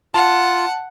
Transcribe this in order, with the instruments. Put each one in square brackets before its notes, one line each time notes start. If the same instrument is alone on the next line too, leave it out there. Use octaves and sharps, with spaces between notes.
[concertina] F4 [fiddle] F#5 [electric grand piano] A5